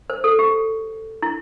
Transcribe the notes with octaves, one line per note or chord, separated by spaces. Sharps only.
C5
A4
G4
E4